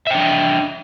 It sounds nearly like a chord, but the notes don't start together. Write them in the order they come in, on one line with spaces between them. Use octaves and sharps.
E5 G5 D4 D#5